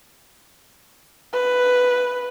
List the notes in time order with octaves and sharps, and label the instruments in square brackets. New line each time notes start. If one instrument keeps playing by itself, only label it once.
[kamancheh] B4